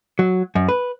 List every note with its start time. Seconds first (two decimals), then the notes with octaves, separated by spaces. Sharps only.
0.19 F#3
0.55 F#2
0.69 B4